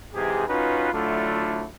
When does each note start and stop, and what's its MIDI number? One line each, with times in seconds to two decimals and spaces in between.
0.14 0.44 44
0.14 0.44 48
0.14 0.44 52
0.14 0.44 67
0.14 0.44 68
0.47 0.92 61
0.47 0.92 63
0.47 0.92 65
0.47 0.92 66
0.47 0.92 71
0.93 1.65 50
0.93 1.65 54
0.93 1.65 57
0.93 1.65 62
0.93 1.65 64
0.93 1.65 65